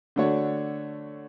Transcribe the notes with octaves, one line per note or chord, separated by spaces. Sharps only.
D3 A3 D4 F#4 C#5